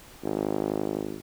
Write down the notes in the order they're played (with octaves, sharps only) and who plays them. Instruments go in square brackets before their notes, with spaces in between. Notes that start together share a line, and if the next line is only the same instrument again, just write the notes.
[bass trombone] G#1